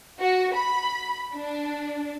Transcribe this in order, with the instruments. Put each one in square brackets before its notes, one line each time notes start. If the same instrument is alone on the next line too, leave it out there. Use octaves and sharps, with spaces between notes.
[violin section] F#4
B5
D4